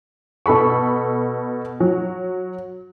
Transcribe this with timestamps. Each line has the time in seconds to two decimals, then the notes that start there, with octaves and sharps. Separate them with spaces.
0.46 B2 A4 B5 C#6
1.80 F#3